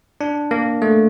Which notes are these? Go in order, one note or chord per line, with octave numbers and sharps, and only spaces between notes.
D4
A#3
A3